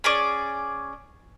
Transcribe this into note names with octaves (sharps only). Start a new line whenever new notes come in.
C#4 G#4 D5